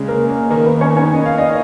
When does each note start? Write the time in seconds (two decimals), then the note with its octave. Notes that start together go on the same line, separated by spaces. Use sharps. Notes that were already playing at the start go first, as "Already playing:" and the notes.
Already playing: C#3 G#3 G#4
0.08 A#3 A#4
0.30 A#3 A#4
0.50 D#3 A#3 A#4
0.66 B3 B4
0.81 C#4 C#5
0.97 C#4 C#5
1.13 D#5
1.26 F5
1.38 D#4 D#5